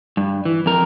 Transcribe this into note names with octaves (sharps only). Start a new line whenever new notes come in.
G2
E3
F2 A#4